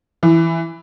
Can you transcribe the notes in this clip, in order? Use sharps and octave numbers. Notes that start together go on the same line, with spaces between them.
E3